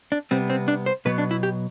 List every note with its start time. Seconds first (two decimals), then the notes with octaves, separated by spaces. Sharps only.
0.12 D4
0.31 C3 G3 B3 C4
0.50 C4
0.68 D4
0.86 C5
1.05 B2 F#3 B3 B4
1.18 D4
1.31 E4
1.43 G4